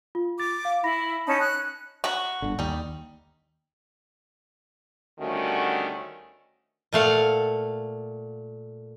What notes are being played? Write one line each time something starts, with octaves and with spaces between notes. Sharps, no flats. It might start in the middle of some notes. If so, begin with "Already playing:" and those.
F4
D6 A6
F5
E4 B5 A#6
C#4 D#4 A5
F#6
F#4 B4 A#5
G1 D3
D#2 G3 D#4
D2 D#3 G3 A3 C#4 F#4
A#2 A3 F5 F#5